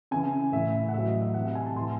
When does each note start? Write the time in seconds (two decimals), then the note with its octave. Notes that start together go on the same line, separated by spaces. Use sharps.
0.11 C#3 E3 G#5
0.52 A2 E3 E5
0.89 F#5
0.93 A2 F#3 E5
1.07 D#5
1.22 E5
1.34 C3 E3 F#5
1.45 F#5
1.55 G#5
1.66 A5
1.76 A2 E3 C6